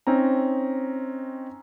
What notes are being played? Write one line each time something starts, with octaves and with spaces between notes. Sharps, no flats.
C4 C#4 D#4 A#5